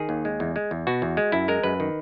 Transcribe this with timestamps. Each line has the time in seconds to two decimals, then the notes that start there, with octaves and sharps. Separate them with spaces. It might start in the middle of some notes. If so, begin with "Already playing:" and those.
Already playing: D#3 G#4
0.09 D#2
0.25 G#3
0.40 E2
0.56 G#3
0.71 E2
0.87 B2 F#4
1.02 E2
1.17 G#3
1.32 F#2 E4
1.48 G#3 A#4
1.63 F#2 B4
1.80 D#3